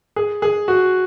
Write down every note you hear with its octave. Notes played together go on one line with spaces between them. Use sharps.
G#4
G#4
F#4